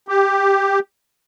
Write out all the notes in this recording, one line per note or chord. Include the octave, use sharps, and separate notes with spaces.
G4